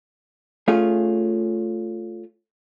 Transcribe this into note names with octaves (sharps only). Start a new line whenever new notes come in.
A3 C#4 F4 G#4